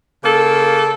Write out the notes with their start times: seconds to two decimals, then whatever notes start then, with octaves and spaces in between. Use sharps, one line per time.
0.24 C#3 A#3 A4